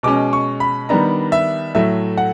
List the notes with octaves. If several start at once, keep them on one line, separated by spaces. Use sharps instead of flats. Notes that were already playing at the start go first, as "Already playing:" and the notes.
B2 G#3 C#4 D6
C#6
B5
D#3 G3 B3 D4 A#5
E5
A2 F#3 A3 E5
F#5